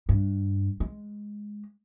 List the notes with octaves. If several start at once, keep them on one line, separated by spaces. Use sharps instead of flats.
G2
G#3